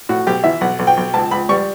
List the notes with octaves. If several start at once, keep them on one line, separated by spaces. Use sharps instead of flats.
A2 F#4
B1 G4
E3 E5
B1 F#5
B1
G5
B1
C#2 A5
C#2 B5
G3 C#6